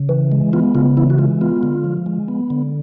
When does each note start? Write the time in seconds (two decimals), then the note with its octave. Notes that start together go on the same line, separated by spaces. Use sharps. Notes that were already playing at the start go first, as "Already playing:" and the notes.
Already playing: C#3
0.09 E3
0.32 G#3
0.53 B3 F4
0.75 C#3 F4
0.97 E3 E4
1.10 F#4
1.18 G#3 F4
1.41 B3 F4
1.63 D3
1.84 F3
2.06 G#3
2.28 B3
2.50 D3